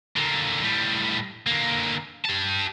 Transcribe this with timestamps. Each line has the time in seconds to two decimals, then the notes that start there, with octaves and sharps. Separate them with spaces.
0.16 D3 A#3
0.63 A2 G3
1.47 D3 A#3
2.25 G4 A5